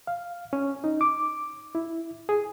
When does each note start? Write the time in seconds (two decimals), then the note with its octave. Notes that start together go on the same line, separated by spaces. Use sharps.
0.07 F5
0.53 C#4
0.84 D#4
1.01 D6
1.75 E4
2.29 G#4